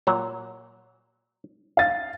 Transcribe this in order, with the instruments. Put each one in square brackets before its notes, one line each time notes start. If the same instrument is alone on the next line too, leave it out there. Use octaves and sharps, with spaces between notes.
[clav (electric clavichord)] A#2 F#3 A#5
[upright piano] F5 A6